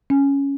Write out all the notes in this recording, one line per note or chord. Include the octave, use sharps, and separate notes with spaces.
C#4